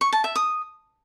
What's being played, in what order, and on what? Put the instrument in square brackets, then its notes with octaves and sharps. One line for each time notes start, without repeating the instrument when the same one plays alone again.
[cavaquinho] C#6
A5
E5
D#6